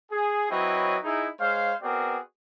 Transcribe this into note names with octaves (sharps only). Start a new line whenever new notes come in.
G#4
F#3 C4 E4 B4 C#5 D#5
D#4 E4 G#4
G#3 C5 C#5 F5
B3 C4 F#4 G#4 A#4 D5